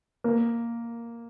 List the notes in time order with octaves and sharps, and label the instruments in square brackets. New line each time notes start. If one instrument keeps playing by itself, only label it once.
[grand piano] A#3